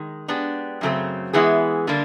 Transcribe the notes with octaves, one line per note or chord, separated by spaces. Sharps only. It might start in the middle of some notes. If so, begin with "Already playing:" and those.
Already playing: D#3 G#3
G#3 B3 D4 G4
F#2 C#3 F#3 A3 C4
E3 G#3 B3 E4 G#4
D3 G3 A#3 D4